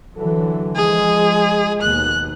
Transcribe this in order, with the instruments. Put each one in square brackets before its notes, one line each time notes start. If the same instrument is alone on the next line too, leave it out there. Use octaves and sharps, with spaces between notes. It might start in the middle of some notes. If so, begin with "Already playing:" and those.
[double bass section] D3 E3 F#3 [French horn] A4
[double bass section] F3 [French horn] G#3 [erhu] G#4
[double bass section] D#2 B2 [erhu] F#6